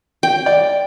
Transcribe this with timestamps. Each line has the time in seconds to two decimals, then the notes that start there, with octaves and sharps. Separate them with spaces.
0.23 G5
0.46 D5